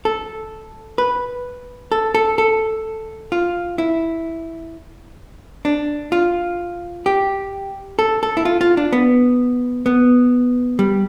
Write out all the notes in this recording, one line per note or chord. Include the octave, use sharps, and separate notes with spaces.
A4
B4
A4
A4
A4
F4
E4
D4
F4
G4
A4
A4
E4
F4
F4
D4
B3
B3
G3